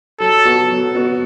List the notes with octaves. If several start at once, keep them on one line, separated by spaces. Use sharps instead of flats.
F#3 A4
B3 F#4
F#3
B3 F#4